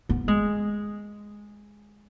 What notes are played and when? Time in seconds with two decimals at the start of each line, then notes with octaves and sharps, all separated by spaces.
0.09 B3
0.28 G#3